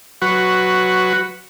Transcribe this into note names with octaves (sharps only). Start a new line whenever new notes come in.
F#3 F#4 B4 C#6